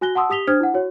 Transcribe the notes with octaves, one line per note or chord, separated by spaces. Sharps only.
F#4 G#5 F#6 A#6 G7
F#5 A5 C6 D#6 E6
G4 D#6 B6 F7 G7
D4 C5 D#6 F6 G#6
E4 F#5
F#4 C#5